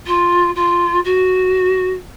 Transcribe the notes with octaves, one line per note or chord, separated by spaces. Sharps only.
F4
F4
F#4